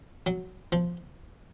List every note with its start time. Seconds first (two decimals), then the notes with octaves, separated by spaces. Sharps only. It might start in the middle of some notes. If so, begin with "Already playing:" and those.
0.26 F#3
0.72 F3